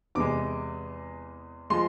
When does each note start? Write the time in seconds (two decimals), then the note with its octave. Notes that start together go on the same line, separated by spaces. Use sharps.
0.15 E2 C3 G#3 D6
1.70 F3 G#3 C6